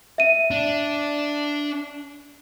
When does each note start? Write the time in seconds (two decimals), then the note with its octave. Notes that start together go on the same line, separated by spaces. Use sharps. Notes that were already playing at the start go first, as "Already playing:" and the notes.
0.18 E5 D#7
0.51 D4